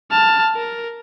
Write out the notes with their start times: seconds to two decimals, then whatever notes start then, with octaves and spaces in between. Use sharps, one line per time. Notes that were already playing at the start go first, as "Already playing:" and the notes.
0.11 A5 F6
0.55 A#4